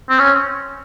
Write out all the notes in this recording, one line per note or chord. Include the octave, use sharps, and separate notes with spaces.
C4
C#4